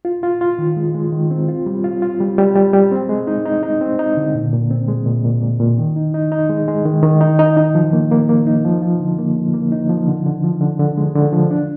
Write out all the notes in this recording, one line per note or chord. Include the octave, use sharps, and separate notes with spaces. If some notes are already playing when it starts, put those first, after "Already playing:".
F4
F4
F4
D#3
G#3
G#3
D#3
C4
F4
G3
F4
F4
G3
G3
G3
G3
C4
G#3
D#4
D#4
D#4
C4
D#4
D3
A#2
A#2
C4
G#3
A#2
A#2
A#2
A#2
D#3
D#4
D#4
D#4
G#3
G#3
D#3
D#3
D#4
D#4
D#4
F3
A#3
A#3
A#3
D#4
F3
F3
D3
A#3
F3
A#3
D#4
F3
D3
D3
F3
D3
D3
G#3
D3
F3
D4